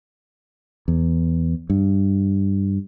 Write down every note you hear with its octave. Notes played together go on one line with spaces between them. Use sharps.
E2
G2